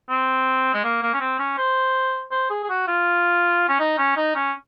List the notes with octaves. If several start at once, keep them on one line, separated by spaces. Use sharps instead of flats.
C4
G#3
A#3
A#3
C#4
C4
C#4
C5
C5
G#4
G#4
F#4
F4
C#4
D#4
C#4
D#4
C#4